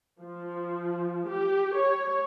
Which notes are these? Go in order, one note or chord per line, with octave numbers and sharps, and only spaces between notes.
F3
G4
C#5